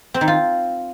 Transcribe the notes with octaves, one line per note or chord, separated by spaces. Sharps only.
C4
D#3
F4